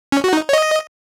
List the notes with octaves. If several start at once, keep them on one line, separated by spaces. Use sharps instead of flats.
C#4
F#4
D#4
C#5
D#5